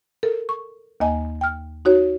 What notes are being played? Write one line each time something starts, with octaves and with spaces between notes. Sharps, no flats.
A4 A#4
C#6
D#2 A#3 D#5 G#5
G5 F6
D#4 F#4 C#5